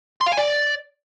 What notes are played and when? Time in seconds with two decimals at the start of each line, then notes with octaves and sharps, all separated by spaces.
0.21 C6
0.26 F5
0.32 G#5
0.37 D5